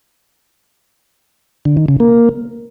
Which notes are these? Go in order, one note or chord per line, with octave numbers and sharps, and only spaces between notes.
D3
D#3
C#3
A#3